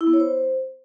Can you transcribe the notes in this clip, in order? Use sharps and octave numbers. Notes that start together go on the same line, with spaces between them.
E4
B3
C#5
C5